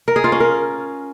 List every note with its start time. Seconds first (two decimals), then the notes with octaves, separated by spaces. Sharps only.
0.08 A#4
0.16 G#4
0.24 F4
0.32 C#4
0.40 A#4